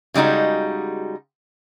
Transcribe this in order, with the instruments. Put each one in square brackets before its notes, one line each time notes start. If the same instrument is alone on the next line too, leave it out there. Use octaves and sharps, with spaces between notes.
[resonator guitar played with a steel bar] C#3 G3 G#3 D#4 F#4